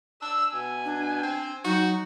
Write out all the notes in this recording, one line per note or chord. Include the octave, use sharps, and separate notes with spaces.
D4 E6
B2 G#5
D4
C4
F#3 D#4 F#4